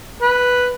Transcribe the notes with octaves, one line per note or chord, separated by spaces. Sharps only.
B4